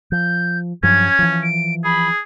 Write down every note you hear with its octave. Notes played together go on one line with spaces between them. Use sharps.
F3 G6
G2 F3 F#3 C#4 G#6
E3 F3
D7
G#4 B5